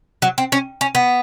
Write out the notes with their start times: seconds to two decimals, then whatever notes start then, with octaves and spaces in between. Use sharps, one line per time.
0.22 F#3
0.38 C4
0.52 C#4
0.81 C#4
0.95 B3